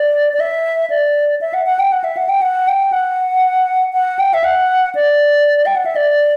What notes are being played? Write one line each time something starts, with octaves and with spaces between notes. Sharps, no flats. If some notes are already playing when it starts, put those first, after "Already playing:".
Already playing: D5
D5
E5
D5
E5
F#5
F#5
G5
F#5
E5
F#5
G5
F#5
G5
F#5
F#5
G5
E5
F#5
D5
G5
F#5
E5
D5